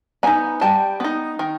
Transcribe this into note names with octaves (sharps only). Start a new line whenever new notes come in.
B3 D#4 G#5 A#5
G3 G5 A5
B3 D#4
D#3